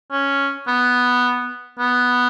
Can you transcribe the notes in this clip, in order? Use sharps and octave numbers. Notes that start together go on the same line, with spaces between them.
C#4
B3
B3